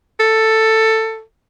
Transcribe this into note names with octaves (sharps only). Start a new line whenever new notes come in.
A4